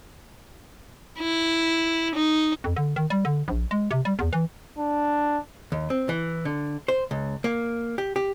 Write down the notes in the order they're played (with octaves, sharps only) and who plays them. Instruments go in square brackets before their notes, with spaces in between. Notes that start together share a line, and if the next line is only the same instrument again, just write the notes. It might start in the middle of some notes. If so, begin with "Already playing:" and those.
[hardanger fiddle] E4
D#4
[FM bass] F2
D3
D#3
G3
D3
A#1
G#3
C3
G3
E2
E3
[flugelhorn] D4
[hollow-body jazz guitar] D#2
C4
E3
D3
C5
C#2
A#3
G4
G4